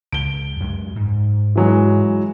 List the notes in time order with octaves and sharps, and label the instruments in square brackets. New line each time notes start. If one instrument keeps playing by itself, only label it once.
[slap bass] C#2 [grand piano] D7 G7
[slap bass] F#2 G#3
G#2
[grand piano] E3 F#3 G#3